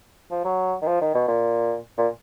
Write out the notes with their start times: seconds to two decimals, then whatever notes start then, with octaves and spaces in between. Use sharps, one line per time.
0.31 F3
0.44 F#3
0.82 D#3
0.87 F3
1.01 D#3
1.14 B2
1.28 A#2
1.98 A#2